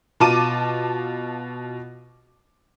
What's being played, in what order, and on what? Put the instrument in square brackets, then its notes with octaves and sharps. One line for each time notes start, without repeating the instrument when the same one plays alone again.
[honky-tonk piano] B2 F4 A5 D6 D#7